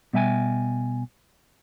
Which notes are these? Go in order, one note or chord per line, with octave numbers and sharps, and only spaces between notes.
B2 G3 E5 G5 G#5